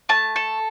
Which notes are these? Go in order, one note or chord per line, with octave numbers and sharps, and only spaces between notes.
A3 A5
A4